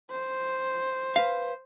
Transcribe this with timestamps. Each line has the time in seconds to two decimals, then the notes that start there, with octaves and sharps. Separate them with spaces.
0.11 C5
1.16 B4 F5